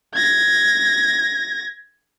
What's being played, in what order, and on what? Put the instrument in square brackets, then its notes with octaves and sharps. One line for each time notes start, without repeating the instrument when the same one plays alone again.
[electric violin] G#6 A#6